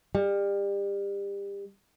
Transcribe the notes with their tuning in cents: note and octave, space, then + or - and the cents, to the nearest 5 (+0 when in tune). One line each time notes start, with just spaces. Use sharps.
G3 +30